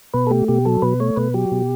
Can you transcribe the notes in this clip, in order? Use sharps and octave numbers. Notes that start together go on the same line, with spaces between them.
B2 B4
A4
A3 G4
B2 G4
F#3 A4
B2 B4
A3 C#5
B2 B4
F#3 G4
B2